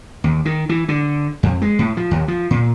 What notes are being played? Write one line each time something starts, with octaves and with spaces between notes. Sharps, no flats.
D#2
D#3
E3
D3
F2
G#3
A2
F3
D#2
F3
A#2